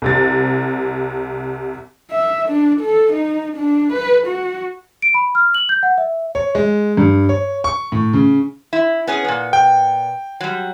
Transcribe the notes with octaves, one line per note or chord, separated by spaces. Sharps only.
C2 C3 A6
E5
D4
A4
D#4
D4
B4
F#4
D7
B5
F6
F#7
G6
F#5
E5
C#5
G#3
G2
C#5
C#6
A2
C#3
E4
B3 C#4 G#4
A#2 B3
G5
F#3 G3